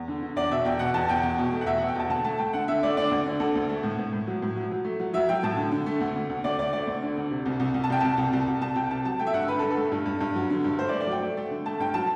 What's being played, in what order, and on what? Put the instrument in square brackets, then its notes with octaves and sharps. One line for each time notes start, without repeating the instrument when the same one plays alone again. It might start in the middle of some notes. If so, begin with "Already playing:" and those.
Already playing: [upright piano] E2
D3
D3
E2 D5
B2 E5
E2 G5
B2 F#5
E2 A5
E2 G5
E2
B2
A3
F#5
E2 E5
B2 F#5
G5
E2 A5
D2 A5
A3 A5
A3 G5
D3 F#5
D3 E5
A3 D5
D3 D5
D2
D3
D2 A4
D2
A3
A2
A2
A2
F#3
A2
F#3
F#3
A3
F#3
F#3 E5
F#3 G5
A2 A5
D3
D3
A3
D2
D2
D2
D2 D5
D2 D5
A3 D5
D2
D3
D2
C3
C2
C2
C2
A5
C2 G5
C2 A5
C2
C2
C2
C2 A5
C2 G5
C3 A5
F#3 A5
A3 G5
E5
G2 F#5
D3 B4
A4
G2
A4
A3
G2
G2
G2
F#3
D3
G2
A3 C5
D5
A3
D5
F#3 G5
A3
A3
D3
A3 A5
G2 G5
F#3 A5